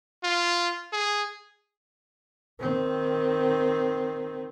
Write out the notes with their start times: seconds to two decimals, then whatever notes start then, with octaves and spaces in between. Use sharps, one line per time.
0.24 F4
0.93 G#4
2.60 D#3 C4